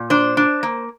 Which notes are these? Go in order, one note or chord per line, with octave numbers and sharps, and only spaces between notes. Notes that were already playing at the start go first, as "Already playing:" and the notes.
Already playing: A#2
D4 C5
D4
A#3